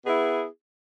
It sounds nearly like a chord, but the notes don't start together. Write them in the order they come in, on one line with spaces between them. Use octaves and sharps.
G#4 B3 E4